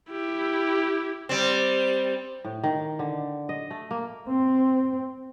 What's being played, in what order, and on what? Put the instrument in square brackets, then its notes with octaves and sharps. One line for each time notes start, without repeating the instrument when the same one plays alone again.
[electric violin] E4 G4
[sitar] G3 C4
[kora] A2
D#3
D3
D#5
A3
A#3
[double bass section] C4